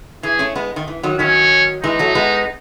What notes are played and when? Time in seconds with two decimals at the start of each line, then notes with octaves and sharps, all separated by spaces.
0.23 E3 G#4
0.39 A3 C#4
0.55 G#3 B3
0.76 D#3
0.88 E3
1.03 D#3 F#3
1.19 D#3 F#3 C#4
1.84 E3 G#3 D#4
1.99 F#3 A3
2.15 G#3 B3